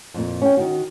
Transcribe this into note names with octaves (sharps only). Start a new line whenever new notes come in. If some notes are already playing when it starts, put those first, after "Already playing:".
F2 A#2
C#4 G5
D#3 F#4